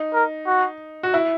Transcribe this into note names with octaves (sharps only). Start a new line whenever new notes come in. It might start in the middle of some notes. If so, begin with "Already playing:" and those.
Already playing: D#4
A#4
F#4
F#4
E4